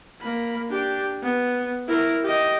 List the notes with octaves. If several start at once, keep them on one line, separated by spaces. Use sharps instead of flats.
A#3 B5
D4 G4
B3
E4 A#4
G4 D#5